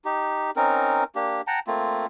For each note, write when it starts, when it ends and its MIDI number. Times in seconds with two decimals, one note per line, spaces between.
0.05 0.51 63
0.05 0.51 67
0.56 1.04 60
0.56 1.04 61
0.56 1.04 63
0.56 1.04 70
1.15 1.41 58
1.15 1.41 62
1.15 1.41 67
1.47 1.60 78
1.47 1.60 79
1.47 1.60 81
1.47 1.60 82
1.67 2.06 57
1.67 2.06 58
1.67 2.06 60
1.67 2.06 65